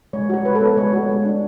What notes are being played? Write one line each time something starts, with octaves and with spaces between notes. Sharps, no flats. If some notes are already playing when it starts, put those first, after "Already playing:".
G#3 C#5
F#4 C#5
G#3 B4
A4
B3
G#3 C#5
F#4
G#3
D4